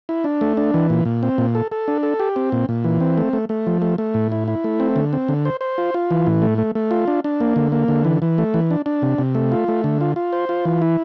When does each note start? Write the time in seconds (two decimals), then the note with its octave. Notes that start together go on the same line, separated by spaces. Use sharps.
0.09 E4
0.24 D4
0.41 A3
0.57 D4
0.74 E3
0.90 A#2
1.05 A#2
1.23 C4
1.38 A#2
1.55 A4
1.72 A4
1.88 D4
2.03 A4
2.20 G4
2.36 C4
2.52 A#2
2.69 A#2
2.84 E3
3.00 C4
3.18 A3
3.33 A3
3.49 A3
3.67 F3
3.82 A3
3.98 A3
4.14 A2
4.32 E4
4.48 E4
4.64 A3
4.80 C4
4.96 D3
5.13 C4
5.28 D3
5.45 C5
5.61 C5
5.78 F4
5.94 F4
6.11 E3
6.27 A2
6.42 A3
6.58 A3
6.75 A3
6.91 F4
7.08 D4
7.24 D4
7.40 A#3
7.56 D3
7.72 A#3
7.88 D3
8.05 E3
8.22 E3
8.38 A3
8.54 E3
8.71 D4
8.86 D4
9.02 C3
9.18 C3
9.35 A3
9.52 F4
9.68 A3
9.84 D3
10.01 F4
10.16 F4
10.33 C5
10.49 F4
10.65 E3
10.82 E4